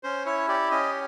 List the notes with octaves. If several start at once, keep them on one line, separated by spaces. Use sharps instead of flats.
C#4 C5
E4 C#5
G4 D5
C#4 D#5